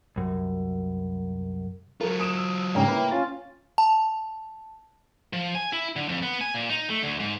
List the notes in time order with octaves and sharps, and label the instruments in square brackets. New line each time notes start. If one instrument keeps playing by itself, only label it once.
[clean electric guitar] C2 F#2
[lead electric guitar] F#3 F4 [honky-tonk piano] A#4
[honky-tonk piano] D#6 D7 E7
[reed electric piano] E6
[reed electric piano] G#2 C#3 G3 [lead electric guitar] A#3 [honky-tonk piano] C#5 G5 A#5
[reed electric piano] E4 B4
C#4 F4 A6
[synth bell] A5
[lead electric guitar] F3
G#5
E4
D3
F2
B3
G#5
A#2
D#4
A3
D2
G#2